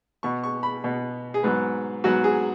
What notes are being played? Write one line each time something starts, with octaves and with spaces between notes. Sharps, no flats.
B2 B3 C#6
C#6
B5
B2 B3
G#4
G#2 F#3 B3 B4
G#2 F#3 B3 F#4
G#4